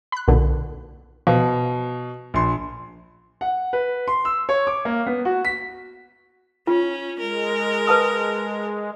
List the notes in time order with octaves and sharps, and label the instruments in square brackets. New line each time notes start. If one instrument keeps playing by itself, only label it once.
[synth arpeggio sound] B5 F#6
B1 A#2 D3
[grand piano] B2 [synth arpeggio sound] F3
[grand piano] A#1 C6
F#5
B4
C6
E6
C#5
D6
A#3
B3
F#4
B6
[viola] C#4 [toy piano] F4
[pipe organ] G#3 [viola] A#4
[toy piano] B4 A5 D#6